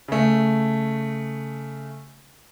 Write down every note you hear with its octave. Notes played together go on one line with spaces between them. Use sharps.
C#3 A3